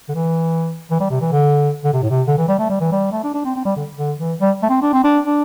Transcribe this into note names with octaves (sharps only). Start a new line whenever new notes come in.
D3
E3
E3
G3
C3
E3
D3
D3
C3
A2
C3
D3
E3
G3
A3
G3
E3
G3
A3
D4
D4
C4
C4
G3
D3
D3
E3
G3
A3
C4
D4
C4
D4
D4